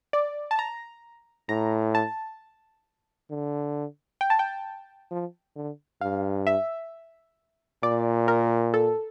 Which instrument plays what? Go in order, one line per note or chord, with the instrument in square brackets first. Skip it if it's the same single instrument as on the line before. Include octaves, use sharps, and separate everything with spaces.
[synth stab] D5
A5
A#5
[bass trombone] A2 [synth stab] A#5
[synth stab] A5
[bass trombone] D3
[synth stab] G5
A5
G5
[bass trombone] F3
D3
[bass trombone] G2 [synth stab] F5
[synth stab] E5
[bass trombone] A#2 [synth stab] D5
[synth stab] A#4
A4